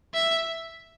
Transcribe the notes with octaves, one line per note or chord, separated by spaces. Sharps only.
E5